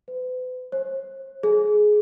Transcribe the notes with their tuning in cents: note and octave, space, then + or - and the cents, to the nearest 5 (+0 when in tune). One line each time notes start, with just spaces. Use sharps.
B4 +40
C5 +45
G#4 +15